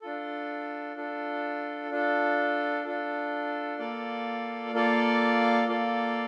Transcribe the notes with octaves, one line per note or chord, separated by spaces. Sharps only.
D4 F4 A4
D4 F4 A4
D4 F4 A4
D4 F4 A4
A#3 F4 A4 D5 F5
A#3 F4 A4 D5 F5
A#3 F4 A4 D5 F5